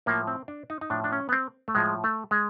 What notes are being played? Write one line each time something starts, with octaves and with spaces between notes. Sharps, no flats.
A2 F3 A#3
C4
D4
D#4
D#4
A2 F3 D4
D4
C#4
B3
C4
A3
A2 F3 G#3
A3
G#3